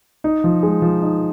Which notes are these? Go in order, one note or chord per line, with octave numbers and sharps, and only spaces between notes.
D#4
F3
G#3
F3
D#4